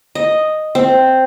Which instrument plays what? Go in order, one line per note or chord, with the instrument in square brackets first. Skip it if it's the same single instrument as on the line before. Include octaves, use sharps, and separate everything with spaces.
[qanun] D#5
C4